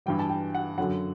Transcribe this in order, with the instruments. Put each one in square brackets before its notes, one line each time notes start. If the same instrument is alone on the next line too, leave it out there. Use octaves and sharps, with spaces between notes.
[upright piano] G2 E3 G3 G5
A5
G5
F#5
F#2 D3 F#3 F#5